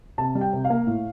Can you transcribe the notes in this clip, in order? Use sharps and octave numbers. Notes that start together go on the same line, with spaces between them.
C3 A5
G3
G5
C3
F5
A#3
A2